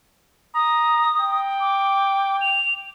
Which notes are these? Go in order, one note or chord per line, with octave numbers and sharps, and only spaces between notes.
A#5 D#6
G5
D6
F7